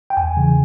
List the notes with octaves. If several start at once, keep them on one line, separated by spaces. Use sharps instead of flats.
G5
E2 G#5
C#3 E3